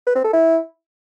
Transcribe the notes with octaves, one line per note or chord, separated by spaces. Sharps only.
B4
C4
A4
E4